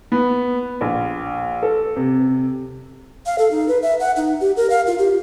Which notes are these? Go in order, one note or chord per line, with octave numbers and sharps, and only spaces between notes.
B3
A#1
A4
C3
F5
A4
D#4
B4
E5
F#5
D#4
G4
A#4
F5
F4
G4